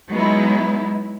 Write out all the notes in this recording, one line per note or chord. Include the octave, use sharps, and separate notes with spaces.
F#3 G#3 B3 D#4 E4